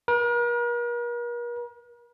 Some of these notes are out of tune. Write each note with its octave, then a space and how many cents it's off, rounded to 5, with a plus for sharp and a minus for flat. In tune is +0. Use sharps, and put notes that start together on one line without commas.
A#4 +45